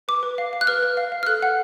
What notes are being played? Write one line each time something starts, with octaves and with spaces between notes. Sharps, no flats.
B4 D6
B4
F5
F5
F#6
B4 F6
B4
F5
F5
F6
A4 F#6
F#5